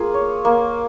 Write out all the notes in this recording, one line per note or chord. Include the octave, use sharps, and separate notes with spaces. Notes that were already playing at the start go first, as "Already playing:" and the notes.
Already playing: A#3 F4 G#4
C#5
A#3